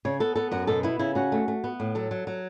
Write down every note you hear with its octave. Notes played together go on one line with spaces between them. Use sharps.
C#3 C#5
B3 A4
B3 A4
F#2 F#4
B2 A4
B3 E4
C#3 E4
C#4 F#4
A3
A3
B3
A2
F#3 A4
F#3
F#3